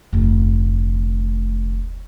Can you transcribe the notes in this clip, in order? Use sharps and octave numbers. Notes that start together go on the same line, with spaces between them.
F1 D2